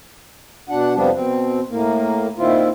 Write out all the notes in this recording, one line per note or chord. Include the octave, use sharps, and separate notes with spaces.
B2 D4 F#5
F2 C3 F3 G3 B3 D4
B2 C4
A2 A#3
A#2 D#3 C4 E4 F4